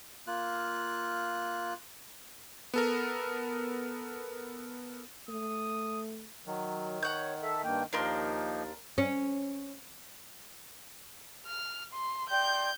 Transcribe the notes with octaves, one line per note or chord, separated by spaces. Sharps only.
A#3 F4 F#6
B3 A4 A#4
A3 D#6
D#3 F#3
C#5 F#5 G6
A4 E5
G2 A#3 G5
D#2 F3 A#3 D4 D#4 A#4 C6
C#4
F6
C6
D5 G5 C6 G6